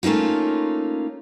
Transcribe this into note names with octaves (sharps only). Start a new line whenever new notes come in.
A3 A#3 C#4 D#4 F4